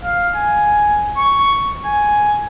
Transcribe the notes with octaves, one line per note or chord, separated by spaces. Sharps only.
F5
G#5
C#6
G#5